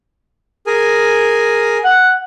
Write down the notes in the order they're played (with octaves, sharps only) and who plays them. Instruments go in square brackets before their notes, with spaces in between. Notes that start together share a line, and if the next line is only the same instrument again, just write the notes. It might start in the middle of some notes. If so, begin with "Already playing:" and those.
[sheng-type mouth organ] G#4 A#4 G#5
[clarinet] F#5